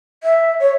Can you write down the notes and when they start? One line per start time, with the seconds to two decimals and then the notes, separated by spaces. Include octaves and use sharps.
0.23 E5
0.60 C#5